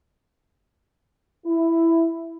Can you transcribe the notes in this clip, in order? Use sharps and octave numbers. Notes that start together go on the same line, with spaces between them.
E4